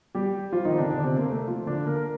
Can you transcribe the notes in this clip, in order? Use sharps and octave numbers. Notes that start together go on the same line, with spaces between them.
G3 G4
F3 F4
D#3 D#4
C4
D3 D4
D3 D4
C3 C4
A#3
A3
F3 F4
D3 D4
A#3 A#4
A#4